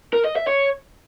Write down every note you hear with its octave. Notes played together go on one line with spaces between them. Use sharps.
A#4
D#5
E5
C#5